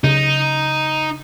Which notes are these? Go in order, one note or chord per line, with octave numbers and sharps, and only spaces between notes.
C#3 D#4